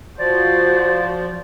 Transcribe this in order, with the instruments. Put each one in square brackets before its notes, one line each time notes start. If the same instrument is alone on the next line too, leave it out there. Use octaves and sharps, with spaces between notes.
[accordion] F3 [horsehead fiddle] F#4 C5 [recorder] D5